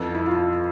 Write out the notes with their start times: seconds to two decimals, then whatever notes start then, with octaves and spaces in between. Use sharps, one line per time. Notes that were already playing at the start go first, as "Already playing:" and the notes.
Already playing: F2 E3 A4
0.15 E4
0.26 F4